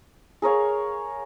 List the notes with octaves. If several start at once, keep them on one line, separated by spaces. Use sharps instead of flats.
G#4 A#4 C#5 F5